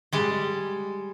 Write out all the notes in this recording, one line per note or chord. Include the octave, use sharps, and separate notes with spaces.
G3 G#3